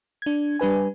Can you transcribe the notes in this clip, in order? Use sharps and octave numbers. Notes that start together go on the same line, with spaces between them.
D4 G#6
G3 D4 B4 G#5